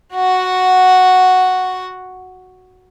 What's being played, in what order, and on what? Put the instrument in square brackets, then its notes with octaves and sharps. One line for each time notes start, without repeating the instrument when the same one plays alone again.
[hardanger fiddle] F#4 F#5